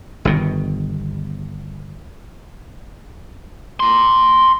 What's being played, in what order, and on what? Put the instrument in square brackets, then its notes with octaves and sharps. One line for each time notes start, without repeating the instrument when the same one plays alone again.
[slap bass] G1 B2 D#3
[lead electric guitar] A#5 C6